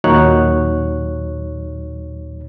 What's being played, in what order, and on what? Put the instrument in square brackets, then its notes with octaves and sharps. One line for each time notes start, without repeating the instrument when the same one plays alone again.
[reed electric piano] D#2 A#2 F#3 D#4 C#5 F#6